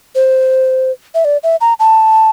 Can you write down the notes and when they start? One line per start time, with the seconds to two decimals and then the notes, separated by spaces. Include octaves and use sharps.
0.15 C5
1.15 E5
1.25 D5
1.43 E5
1.61 A#5
1.79 A5